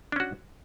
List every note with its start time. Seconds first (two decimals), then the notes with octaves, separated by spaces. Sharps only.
0.12 D4
0.16 C#4
0.20 F#4